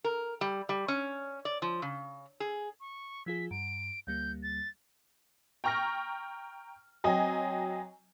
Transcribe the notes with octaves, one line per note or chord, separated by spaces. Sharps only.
A#4
G3
G3
C#4
D5
F3
C#3
G#4
C#6
F3 F4 G#4 B6
G2 D7
D2 G3 A#3 G6
A6
G5 A#5 C#6 F6 A#6
F#3 C4 D#5 G#5